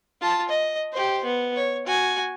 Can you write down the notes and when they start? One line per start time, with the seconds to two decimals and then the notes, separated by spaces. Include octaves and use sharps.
0.21 F4 A5
0.49 D#5
0.93 G4 C5
1.24 B3
1.56 C#5
1.86 F#4 G#5